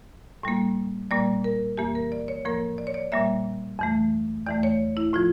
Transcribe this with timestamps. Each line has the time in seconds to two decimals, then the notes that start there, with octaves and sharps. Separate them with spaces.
0.43 A2 G3 A#3
1.11 A#2 G3 A#3 D5
1.44 A#4
1.77 F2 E3 A#3 G4
1.95 A#4
2.12 D5
2.28 C#5
2.45 A2 F3 A#3 A#4
2.78 D5
2.87 C#5
2.94 D5
3.12 A#2 G3 A#3 E5
3.79 F2 E3 A3
4.46 E2 E3 A3 D5
4.63 C#5
4.97 E4
5.13 A2 F3 F4